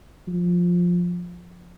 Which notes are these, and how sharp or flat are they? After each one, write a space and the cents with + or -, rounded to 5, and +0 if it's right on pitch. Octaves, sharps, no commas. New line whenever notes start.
F3 +10